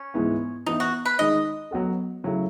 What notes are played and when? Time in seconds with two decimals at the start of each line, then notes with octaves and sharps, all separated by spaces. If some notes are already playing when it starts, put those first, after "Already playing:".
Already playing: C#4
0.14 G#2 E3 G#3 B3 E4
0.66 E3 B3 D#4 E4
0.80 F#4
1.05 B4
1.19 D#3 G#3 D#4 D#5
1.71 F#3 B3 F#4 A4
2.24 C#3 F#3 A3 E4